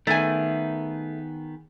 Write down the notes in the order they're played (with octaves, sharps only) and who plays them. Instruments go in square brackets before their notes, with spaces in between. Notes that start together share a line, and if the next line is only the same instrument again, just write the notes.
[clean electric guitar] D#3 B3 G#4 [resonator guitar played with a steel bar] A3 G#5